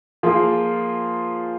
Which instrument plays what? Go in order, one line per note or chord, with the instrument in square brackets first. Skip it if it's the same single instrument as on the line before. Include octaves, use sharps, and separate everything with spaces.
[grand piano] F3 A#3 F4 G#4